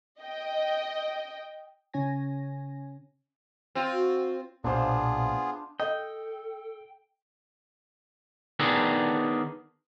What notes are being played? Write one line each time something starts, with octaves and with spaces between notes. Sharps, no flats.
D#5 G5
C#3 C#4 C#5 G#5 A#6
C4 F4
F#4
B1 A#2 B3 D4 F4 G#4 C5 F5
A4 D#5 G5
D#3 B3 D4 G#4 A4